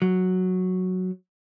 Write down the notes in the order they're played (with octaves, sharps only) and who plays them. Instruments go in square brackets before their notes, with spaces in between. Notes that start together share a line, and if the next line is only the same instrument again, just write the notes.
[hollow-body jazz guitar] F#3